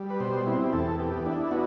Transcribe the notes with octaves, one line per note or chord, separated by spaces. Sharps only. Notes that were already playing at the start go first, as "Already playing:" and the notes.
Already playing: G3
B4
B2 C5
C4 E4
G4
E2 A4
B3 G4
D4 E4
B3 F#4